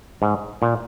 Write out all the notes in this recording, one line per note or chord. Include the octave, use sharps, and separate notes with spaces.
G#2
A#2